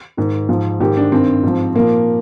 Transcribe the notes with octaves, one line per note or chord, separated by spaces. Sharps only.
G#2 D#3
G#2 F3
G#2 D#3 G4
D4
G2 D#3 C4
G#2 F3
A#2 F3 A#3